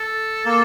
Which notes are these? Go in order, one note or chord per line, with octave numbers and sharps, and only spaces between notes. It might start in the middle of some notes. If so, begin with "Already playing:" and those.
Already playing: A4
A#3